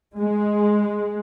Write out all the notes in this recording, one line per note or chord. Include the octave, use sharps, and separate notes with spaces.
G#3